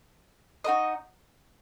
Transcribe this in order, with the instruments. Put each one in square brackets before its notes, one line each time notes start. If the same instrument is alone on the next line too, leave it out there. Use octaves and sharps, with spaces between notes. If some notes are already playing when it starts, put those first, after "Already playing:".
[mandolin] D#4 F#4 A#4 D#5